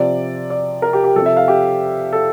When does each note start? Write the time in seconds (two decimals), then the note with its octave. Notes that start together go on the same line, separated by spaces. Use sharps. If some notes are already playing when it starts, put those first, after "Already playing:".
Already playing: C3 F3 D5
0.50 D5
0.82 A#4
0.93 G4
1.04 G4
1.16 C3 F3 A4
1.26 E5
1.37 F5
1.48 G4
2.13 A4